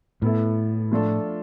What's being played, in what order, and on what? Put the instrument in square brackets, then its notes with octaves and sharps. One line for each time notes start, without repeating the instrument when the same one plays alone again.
[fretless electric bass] A2 [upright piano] B3 E4 A4
[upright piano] F3 A3 D4 F4 A4